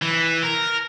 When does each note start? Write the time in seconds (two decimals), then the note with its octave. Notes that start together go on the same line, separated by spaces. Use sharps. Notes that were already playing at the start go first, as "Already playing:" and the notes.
0.02 E3
0.43 A#4